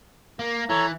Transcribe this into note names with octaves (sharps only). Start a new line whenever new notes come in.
A#3
E3 A4 C#5 A#5